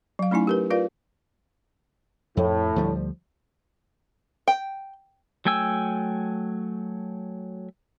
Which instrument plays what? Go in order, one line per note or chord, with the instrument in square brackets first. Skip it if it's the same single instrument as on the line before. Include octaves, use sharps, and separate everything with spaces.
[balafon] F#3 F5
A3 C#4 D#4 E4 G#5
G4 A#4 B4
F4 A#4 B4 D5 F5
[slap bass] F2 [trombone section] A2
[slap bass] D2 F3 G3
[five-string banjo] G5
[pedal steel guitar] F#3 A3 G5 G#5 E6